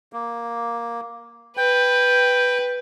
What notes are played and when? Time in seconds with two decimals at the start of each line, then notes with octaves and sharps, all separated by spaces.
0.13 A#3
1.57 B4 G5